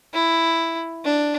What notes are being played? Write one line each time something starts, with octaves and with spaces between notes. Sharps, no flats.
E4
D4